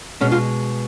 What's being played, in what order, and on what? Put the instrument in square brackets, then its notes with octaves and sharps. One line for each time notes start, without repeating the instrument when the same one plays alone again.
[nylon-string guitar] B2 G#3 C#4
F4